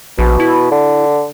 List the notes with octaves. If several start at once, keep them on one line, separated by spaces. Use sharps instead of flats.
A#1 B2
E4
D3